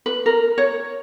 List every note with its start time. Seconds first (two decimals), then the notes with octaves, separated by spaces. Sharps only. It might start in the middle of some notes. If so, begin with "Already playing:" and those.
0.06 B4
0.26 A#4
0.58 C#5